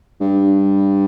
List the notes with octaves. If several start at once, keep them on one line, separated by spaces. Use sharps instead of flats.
G2